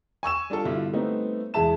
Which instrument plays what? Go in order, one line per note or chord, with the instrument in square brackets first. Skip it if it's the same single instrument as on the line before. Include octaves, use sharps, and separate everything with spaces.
[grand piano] G#5 C#6 E6 E7
G3 D4 F4 A4
G2 B2 D3 G3 E4 F4
G3 A3 B3 C4 D#4
E2 G#3 G#4 E5 A5 E7